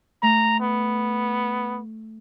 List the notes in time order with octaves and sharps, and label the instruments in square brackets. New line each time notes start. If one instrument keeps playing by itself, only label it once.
[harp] A3 [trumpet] A#5
[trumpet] B3